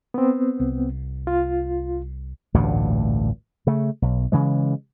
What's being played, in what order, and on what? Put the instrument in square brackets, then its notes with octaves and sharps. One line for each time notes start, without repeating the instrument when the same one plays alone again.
[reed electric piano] B3 C4
[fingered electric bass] C2
[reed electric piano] F4
[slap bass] A1 D2 G2 A#2
C#3 A3
B1
C#3 E3 G#3